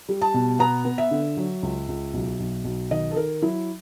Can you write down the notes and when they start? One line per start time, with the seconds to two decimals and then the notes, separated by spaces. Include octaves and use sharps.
0.09 G3
0.21 A5
0.34 B2
0.59 B3 A#5
0.85 B3
0.98 E5
1.11 D3
1.37 F#3
1.63 C#2
1.88 C#2
2.14 B1
2.40 B1
2.64 B1
2.91 D#3 D#5
3.11 A4
3.16 D#3 A#4
3.42 F#3 E4